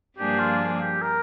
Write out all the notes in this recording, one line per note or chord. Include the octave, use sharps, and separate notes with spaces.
G2 F3 A#3 D4 G4 G#4
F4
G4
A#4